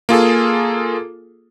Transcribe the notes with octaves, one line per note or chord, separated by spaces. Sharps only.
A#3 F4 G#4 A4